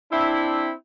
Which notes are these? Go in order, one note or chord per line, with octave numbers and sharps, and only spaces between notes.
C4 D4 E4